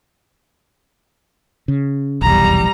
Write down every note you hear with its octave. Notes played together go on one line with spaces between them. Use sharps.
C#3
F1 B1 E2 G3 A#5